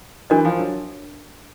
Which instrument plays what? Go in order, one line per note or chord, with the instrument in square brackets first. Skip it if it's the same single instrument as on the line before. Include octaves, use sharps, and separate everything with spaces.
[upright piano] E3 [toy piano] D4 F#4 A#4 D#5
[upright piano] F3
F#3